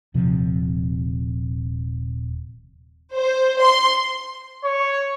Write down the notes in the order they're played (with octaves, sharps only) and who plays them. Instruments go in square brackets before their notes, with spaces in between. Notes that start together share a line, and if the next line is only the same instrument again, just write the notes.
[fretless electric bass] D#1 C3 F3
[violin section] C5
C6
[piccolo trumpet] C#5